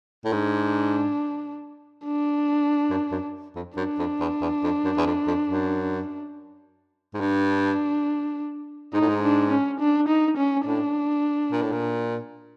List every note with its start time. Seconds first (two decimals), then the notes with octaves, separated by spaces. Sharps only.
0.25 A2
0.32 G#2 D4
2.05 D4
2.90 F#2
3.12 F#2
3.56 F2
3.77 F#2 D4
3.99 F2
4.20 E2
4.41 E2
4.63 F2
4.85 F#2
4.97 E2
5.06 F2
5.27 F2
5.49 F#2
7.14 G#2
7.21 G2 D4
8.93 G#2 D#4
9.01 A2
9.08 G#2
9.23 D4
9.51 C#4
9.80 D4
10.09 D#4
10.37 C#4
10.65 A2 D4
11.52 A#2
11.62 A2
11.72 A#2